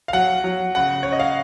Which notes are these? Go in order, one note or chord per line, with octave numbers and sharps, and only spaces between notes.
F5
F#3 F#5
F#3
C#3 F#5
C#4 C#5
D#5
F5